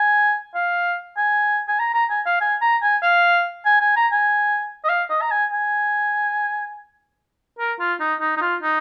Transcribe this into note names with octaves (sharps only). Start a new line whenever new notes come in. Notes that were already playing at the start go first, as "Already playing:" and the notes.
Already playing: G#5
F5
G#5
G#5
A#5
A#5
G#5
F5
G#5
A#5
G#5
F5
G#5
G#5
A#5
G#5
D#5
F5
D#5
A#5
G#5
G#5
A#4
F4
D#4
D#4
D#4
F4
D#4